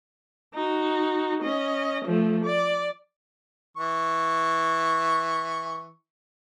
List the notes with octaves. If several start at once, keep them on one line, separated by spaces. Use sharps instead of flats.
D#4 F#4
C#4 D#5
F3 A3
D5
E3 C#6